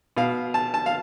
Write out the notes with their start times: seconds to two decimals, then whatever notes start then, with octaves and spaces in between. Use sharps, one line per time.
0.17 B2 F5
0.54 A5
0.74 A5
0.86 F5